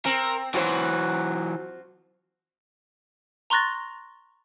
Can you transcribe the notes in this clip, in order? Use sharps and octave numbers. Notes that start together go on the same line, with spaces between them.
C4 A#4
E3 F#3 F4 F#4 C5
A#5 C6 C#6 F#6 A6 A#6